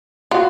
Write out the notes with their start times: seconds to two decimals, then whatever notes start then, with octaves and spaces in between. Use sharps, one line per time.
0.31 F4 F#4 F#5